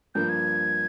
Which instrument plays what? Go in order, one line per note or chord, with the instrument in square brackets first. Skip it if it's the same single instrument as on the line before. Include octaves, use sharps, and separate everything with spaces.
[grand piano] G2 F3 A#3 [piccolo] G6
[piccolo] G#6